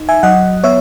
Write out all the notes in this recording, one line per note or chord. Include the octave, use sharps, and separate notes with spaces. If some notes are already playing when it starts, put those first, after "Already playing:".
Already playing: D#4
E5 G#5
F#3 D#5 F#5
B3 C#5 E5